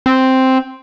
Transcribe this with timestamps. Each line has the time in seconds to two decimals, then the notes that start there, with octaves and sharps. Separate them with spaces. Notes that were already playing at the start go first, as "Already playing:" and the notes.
0.06 C4